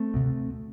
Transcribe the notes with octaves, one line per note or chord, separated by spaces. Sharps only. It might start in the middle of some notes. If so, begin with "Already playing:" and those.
Already playing: A3 C4
D2 C3